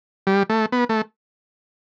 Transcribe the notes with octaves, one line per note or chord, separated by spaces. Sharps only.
G3
A3
B3
A3